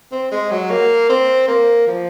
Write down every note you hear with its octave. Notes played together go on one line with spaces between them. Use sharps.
C4
G#3
F#3
A#3
C4
A#3
F3